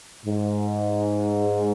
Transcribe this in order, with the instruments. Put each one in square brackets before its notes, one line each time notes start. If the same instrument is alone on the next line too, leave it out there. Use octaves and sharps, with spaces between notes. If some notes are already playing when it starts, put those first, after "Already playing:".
[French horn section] G#2